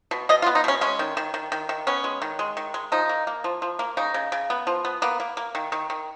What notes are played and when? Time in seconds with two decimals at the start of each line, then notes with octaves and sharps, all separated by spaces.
0.11 B2
0.29 B2 D#5
0.42 F4
0.46 B3
0.55 D#4
0.64 B2 C#4
0.81 G#3 C#4
0.99 D#3
1.17 D#3
1.34 D#3
1.52 D#3
1.69 D#3
1.87 B3 C#4
2.04 G#3
2.22 D#3
2.39 G#3
2.57 D#3
2.74 G#3
2.92 F3 D#4
3.09 A#3
3.27 A#3
3.44 F3
3.62 F3
3.79 A#3
3.97 C#3 D#4
4.14 C#3
4.32 C#3
4.50 B3
4.67 F3
4.85 B3
5.02 A#3 B3
5.20 A#3
5.37 A#3
5.55 D#3
5.72 D#3
5.90 D#3